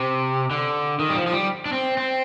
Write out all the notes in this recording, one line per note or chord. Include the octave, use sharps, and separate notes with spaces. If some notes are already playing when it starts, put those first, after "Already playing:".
Already playing: C3
D3
D#3
G3
F3
F3
G3
D4
C4
C4